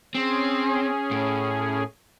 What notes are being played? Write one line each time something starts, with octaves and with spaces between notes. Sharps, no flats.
C4 C#4 G#4
A2